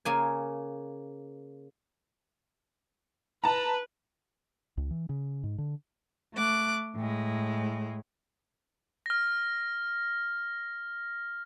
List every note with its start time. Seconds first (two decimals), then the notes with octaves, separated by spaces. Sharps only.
0.05 C#3 A#3 G#5
3.44 B4 A5 A#5
4.77 C#2
4.91 E3
5.09 C#3
5.43 G#2
5.58 D3
6.34 A3 D6 F#6
6.95 A2 G#3
9.06 F6 A#6